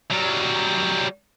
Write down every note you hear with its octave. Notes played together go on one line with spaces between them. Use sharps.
F#3 G3